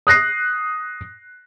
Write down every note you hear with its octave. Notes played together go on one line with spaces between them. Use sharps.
D#6 F#6 A#6 C7